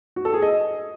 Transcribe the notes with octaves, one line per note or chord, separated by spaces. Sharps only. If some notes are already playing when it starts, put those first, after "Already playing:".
F#4
A4
G#4
D#5